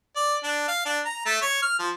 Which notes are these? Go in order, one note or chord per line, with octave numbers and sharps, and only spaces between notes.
D5
D4
F5
D4
A#5
A3
C#5
F6
F3